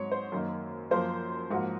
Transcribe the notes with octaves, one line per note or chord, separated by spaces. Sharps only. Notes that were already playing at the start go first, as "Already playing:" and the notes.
Already playing: G#2 F#3 C4 C#5
C5
F#2 D#3 A#3
F#2 F3 A#3 C5
G#2 F3 A#3 F#4